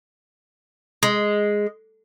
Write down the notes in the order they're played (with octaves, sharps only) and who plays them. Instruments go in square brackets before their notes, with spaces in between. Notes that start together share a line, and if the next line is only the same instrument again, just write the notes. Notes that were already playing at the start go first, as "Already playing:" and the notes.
[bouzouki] G#3